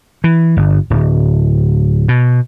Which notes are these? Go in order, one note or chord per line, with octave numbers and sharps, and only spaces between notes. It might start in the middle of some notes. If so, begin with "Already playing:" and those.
E3
G1
D1
B2